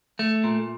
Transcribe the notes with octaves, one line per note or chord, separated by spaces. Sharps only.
A3
A#2